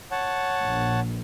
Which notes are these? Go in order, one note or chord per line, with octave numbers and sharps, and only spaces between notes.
C#5 F#5 A5
A#1